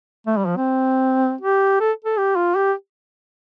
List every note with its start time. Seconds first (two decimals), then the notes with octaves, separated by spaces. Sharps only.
0.27 A3
0.37 G3
0.46 F3
0.57 C4
1.41 G4
1.80 A4
2.04 A4
2.17 G4
2.36 F4
2.55 G4